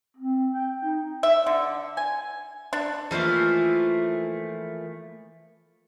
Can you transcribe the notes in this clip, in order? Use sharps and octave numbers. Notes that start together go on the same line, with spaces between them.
C4
G5
D#4
E5
D3
G#5
D4
E3 F3 A3 A#3